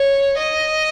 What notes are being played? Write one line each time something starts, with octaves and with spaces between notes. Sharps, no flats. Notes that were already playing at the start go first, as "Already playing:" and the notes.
Already playing: C#5
D#5